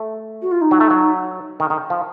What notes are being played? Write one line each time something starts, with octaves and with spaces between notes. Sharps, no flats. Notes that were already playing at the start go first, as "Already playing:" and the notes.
Already playing: A3
F#4
F4
D#4
F#3
A3
F#3
D#3
D#3
F3